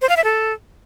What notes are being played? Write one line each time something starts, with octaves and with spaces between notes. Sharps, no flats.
C5
F5
E5
A4